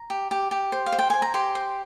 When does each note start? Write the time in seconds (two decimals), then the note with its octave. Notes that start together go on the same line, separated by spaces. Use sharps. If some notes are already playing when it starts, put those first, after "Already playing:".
Already playing: A#5
0.10 G4
0.31 G4
0.51 G4
0.72 C5
0.86 F5
0.92 C5
0.99 G5
1.10 C5 G#5
1.22 A#5
1.34 G4 C6
1.55 C5